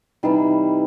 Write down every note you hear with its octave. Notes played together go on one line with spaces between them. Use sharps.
C3 E3 G3 D#4